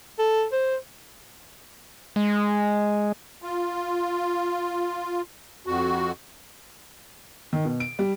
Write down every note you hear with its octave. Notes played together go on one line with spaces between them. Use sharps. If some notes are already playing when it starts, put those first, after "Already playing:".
A4
C5
G#3
F4
F2 F#4
D#3
B2
D7
G3